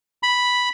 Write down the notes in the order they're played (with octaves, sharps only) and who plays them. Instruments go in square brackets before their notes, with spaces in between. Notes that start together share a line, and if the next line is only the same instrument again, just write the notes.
[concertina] B5